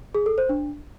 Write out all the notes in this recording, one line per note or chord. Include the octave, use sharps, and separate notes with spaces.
G#4
A4
C5
D4